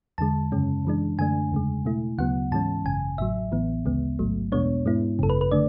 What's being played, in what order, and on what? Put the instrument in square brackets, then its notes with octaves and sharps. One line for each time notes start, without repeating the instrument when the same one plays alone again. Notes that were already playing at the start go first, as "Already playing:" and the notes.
[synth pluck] E2 D3 G#3 A5
F#2 C#3 G#3 C#4
F#2 E3 G#3 D4
F#2 D3 A3 D4 G#5
E2 C#3 G#3
B2 A3 E4
D2 C#3 F#3 B3 F#5
G#2 E3 G#3 C#4 A5
G#1 F#2 C#3 G#5
A1 A2 F#3 E5
A1 A2 E3 B3
D2 C#3 G#3 B3
A1 G#2 F#3 A3
E2 B2 G#3 B3 D4 C#5
G#2 G#3 B3 E4
G#1 F#2 C#3 A4
B4
B4
D3 A3 D4 D5